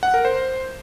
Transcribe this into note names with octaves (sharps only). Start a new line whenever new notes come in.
F#5
A#4
C5